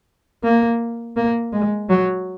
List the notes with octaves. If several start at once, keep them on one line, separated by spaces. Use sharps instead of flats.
A#3
A#3
G#3
F#3